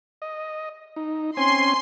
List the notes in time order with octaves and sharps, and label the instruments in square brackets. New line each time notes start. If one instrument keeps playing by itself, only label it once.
[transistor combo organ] D#5
D#4
[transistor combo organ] C4 C#4 G#5 [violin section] C6